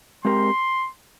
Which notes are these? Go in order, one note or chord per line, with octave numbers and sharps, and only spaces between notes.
G#3 C4 G4 A#4 C6